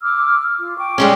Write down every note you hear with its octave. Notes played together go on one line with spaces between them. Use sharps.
D6 E6 F6
F4
G5 C#6 D6
G3 G#3 C#4